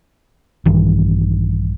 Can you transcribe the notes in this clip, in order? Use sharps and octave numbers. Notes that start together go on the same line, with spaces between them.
A#1 G2 D#3 E3